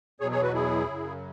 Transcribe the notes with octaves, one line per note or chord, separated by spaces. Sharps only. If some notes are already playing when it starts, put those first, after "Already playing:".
E2 B2 F#3 G#4 C#5
G#4 C#5
F#4 B4
E4 G#4
F#2 C#3 F#3